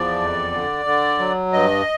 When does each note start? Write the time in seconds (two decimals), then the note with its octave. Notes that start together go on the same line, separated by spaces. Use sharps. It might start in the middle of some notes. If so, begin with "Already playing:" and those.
Already playing: E2 F3 D5
0.19 F2
0.52 D3
0.85 D3
1.19 F#3
1.53 G2 D#5